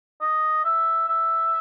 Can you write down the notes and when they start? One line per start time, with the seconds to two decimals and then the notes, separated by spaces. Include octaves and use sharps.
0.21 D#5
0.65 E5
1.08 E5